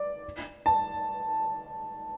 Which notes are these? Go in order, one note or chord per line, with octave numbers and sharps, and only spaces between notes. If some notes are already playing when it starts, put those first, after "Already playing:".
Already playing: D5
A5